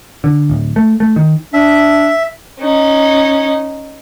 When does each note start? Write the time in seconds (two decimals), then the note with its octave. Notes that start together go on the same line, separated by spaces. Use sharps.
0.24 D3
0.50 D1
0.76 A3
1.00 A3
1.16 D#3
1.53 D4 E5
2.59 C#4 D#4